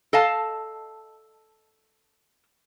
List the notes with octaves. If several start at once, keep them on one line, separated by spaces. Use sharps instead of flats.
A4 D#5 F5 A5